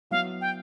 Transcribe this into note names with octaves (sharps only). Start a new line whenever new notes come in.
F#3 B3 E4 F5
G5